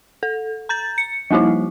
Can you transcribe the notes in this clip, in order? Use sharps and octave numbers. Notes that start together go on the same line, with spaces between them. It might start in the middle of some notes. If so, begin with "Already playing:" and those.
A4
A#5 G6 A6
C#7
F3 G3 A#3 D#4 E4